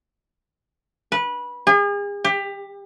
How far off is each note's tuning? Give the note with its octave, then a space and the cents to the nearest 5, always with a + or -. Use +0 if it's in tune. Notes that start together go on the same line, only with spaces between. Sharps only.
B4 -20
G#4 -40
G4 +20